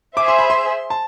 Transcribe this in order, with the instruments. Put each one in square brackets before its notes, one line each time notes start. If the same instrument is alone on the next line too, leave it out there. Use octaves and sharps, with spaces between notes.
[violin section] G#4 C5 E5 [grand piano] D6
[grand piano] C6
B5
C6
A5